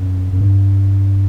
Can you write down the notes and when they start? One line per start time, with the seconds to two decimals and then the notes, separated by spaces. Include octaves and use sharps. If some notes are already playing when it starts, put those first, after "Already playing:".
Already playing: F#2
0.33 F#2
0.41 G2